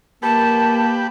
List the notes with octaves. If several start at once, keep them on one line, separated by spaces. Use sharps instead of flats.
A#3 G4 B4 A5